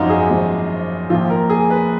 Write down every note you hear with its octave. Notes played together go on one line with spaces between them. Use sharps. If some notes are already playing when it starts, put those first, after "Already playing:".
Already playing: G#1 F#2 F3 D#4 F4 F#4
G#4
G#1 F#2 F3
A#1 A#2 F3 F4
A#4
G#4
B4